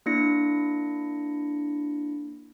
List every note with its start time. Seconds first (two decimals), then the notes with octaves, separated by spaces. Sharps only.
0.06 A#3 D4 E4 A#6 C#7